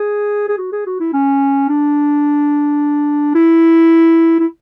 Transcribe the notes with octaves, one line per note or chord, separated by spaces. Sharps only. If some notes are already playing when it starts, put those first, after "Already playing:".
Already playing: G#4
G#4
F#4
G#4
F#4
E4
C#4
D4
E4
E4